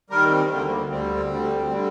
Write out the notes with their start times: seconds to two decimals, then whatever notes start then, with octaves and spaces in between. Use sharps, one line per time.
0.10 D#2 D#3 G3 A#4
0.30 C4
0.50 D2 D3 G3 A#3
0.70 A#3
0.89 D2 D3 G3 C4
1.30 D2 D3 G3
1.69 D3 G3